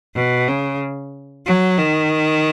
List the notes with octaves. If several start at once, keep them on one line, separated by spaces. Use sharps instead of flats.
B2
C#3
F#3
D#3